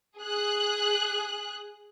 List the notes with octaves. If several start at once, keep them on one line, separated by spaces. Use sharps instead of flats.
G#4 F#6